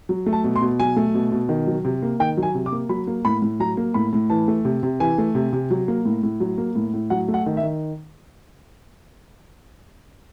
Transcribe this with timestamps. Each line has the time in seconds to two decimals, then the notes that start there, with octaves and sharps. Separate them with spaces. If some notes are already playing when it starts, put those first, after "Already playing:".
0.09 F#3
0.26 A3
0.33 A5
0.44 B2
0.56 C6
0.61 B2
0.80 F#3 G#5
0.96 A3
1.14 B2
1.32 B2
1.49 D#3
1.67 F#3
1.85 C3
2.02 A#3
2.20 D#3 G5
2.37 F#3
2.43 G#5
2.54 C3
2.66 D6
2.72 A#3
2.89 F#3 B5
3.07 A#3
3.25 A2 B5
3.42 A2
3.60 F#3 A#5
3.77 A#3
3.94 A2 B5
4.13 A2
4.30 E3 A5
4.48 A3
4.65 C3
4.83 C3
5.00 E3 G#5
5.18 A3
5.35 C3
5.53 C3
5.70 F#3
5.88 A#3
6.05 A2
6.23 A2
6.40 F#3
6.58 A#3
6.75 A2
6.94 A2
7.10 F#3 F#5
7.28 A3
7.34 F#5
7.46 D#3
7.57 E5
7.63 D#3